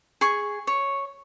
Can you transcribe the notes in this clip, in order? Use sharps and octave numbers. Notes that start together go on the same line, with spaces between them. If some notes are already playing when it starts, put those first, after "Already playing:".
G#4 C#6
C#5